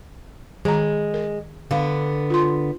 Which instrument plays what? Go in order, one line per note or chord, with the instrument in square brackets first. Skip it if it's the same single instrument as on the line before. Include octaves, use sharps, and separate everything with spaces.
[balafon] D#3 A#5 [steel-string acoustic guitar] G#3
[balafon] A#4
[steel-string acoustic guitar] D3 B3 [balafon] F5
[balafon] F4 C6